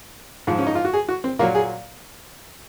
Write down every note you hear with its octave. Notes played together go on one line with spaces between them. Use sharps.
G#2 F3
C#4
D#4
F4
F#4
G#4
F#4
C4
A#2 F#3 A#3
G#4